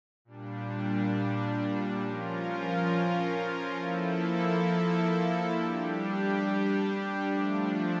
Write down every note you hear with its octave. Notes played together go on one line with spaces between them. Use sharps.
A#2 G3 D4
F3 C#4 F4 A#4
F3 A#3 E4 A4
G3 D4 G4
F3 A3 D4